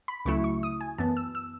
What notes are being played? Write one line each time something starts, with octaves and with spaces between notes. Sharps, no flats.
B5
C#2 C#3 F#3 A3 E4 C#6
C#6
D#6
G#5
F#2 E3 B3 A5
E6
E6